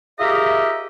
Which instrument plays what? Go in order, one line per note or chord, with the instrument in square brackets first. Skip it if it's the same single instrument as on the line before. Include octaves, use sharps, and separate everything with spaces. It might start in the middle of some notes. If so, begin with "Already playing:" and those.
[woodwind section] F4 G4 G#4 A#4 D#5 E5